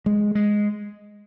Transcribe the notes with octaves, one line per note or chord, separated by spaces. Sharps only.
G#3
G#3